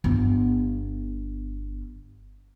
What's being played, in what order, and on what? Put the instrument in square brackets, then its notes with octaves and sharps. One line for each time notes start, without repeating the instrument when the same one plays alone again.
[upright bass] G1 B3